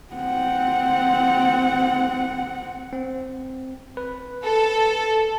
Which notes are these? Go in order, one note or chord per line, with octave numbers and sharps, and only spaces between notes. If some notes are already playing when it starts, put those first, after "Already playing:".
C4 F#5
C4
B4
A4